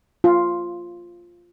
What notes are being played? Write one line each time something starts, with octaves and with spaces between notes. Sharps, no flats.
F4